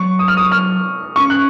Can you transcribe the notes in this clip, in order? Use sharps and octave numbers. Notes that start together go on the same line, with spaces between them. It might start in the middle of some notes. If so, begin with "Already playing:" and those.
Already playing: F#3 C#6
D#6
F6
D#6
F6
C#4 C#6
F#6